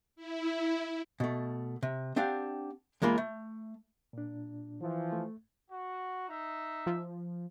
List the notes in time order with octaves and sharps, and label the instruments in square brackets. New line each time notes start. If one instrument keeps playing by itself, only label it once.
[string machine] E4
[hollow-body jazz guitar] B2 A3
C3
C4 D4 G4 F5 F#5
E2 G#3 A#3 F4 B5
A3
[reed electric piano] A#2 D4
[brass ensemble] E3 F3
[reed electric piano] A3
[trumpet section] F#4
D#4 E5
[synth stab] F3